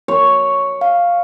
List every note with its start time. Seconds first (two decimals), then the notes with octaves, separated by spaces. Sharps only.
0.08 C#5
0.81 F5